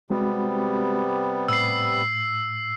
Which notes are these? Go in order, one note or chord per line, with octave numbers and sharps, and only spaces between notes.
C3 G3 G#3 B3 C4 F#4
A2 E6 C7